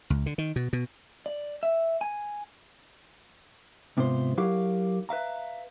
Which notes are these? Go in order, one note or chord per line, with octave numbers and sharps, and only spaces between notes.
C#2
D3
D#3
B2
B2
D5
E5
G#5
G#2 C3 B3 F4 G#4 C5
F#3 E4 G4 A#4 F5
B4 E5 F5 A#5